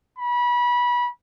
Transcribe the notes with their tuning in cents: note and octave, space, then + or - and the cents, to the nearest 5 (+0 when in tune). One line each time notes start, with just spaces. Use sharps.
B5 -25